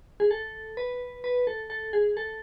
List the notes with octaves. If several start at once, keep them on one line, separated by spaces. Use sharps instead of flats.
G#4
A4
B4
B4
A4
A4
G#4
A4